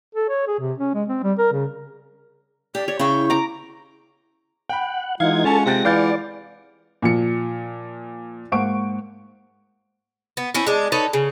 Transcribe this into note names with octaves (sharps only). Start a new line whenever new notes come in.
A4
C#5
G#4
C3
C#4
G#3
C4
G3
A#4
C#3
G4 D5
C#5 D5
C#3 E4 G5 C#6
A#5 D6
F#5 G5 B5
E3 G#3 D#4 F4 F5 F#5 G#6
C#4 A4 A5
C3 C4 G5 A6 A#6
E3 D5 F5 G6 A6
A#2 F3 C#7
G#2 A#3 C5 F#5 C#6 D7
B3
C4 C#4 E4
G#3 D4
D#4 A4 B4 C#5
C#3